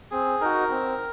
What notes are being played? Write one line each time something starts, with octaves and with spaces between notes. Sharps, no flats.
C4 G#4
D#4 F#4 A#4
C4